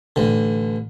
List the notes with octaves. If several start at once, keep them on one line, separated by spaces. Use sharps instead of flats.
A1 D3